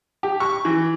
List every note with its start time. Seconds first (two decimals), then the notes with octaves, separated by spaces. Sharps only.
0.23 G4
0.40 C#6
0.65 E3